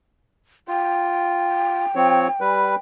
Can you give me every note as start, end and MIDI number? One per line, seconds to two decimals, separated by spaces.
0.68 1.85 65
0.68 2.79 79
1.95 2.28 53
1.95 2.28 60
1.95 2.28 73
2.41 2.75 55
2.41 2.75 71